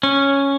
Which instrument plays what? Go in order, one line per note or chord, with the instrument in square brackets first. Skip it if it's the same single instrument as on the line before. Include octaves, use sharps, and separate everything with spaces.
[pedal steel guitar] C#4